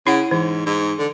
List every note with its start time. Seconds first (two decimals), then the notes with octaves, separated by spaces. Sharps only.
0.07 C#3 E4 F#5
0.31 G#2 E3
0.66 G#2
0.98 D3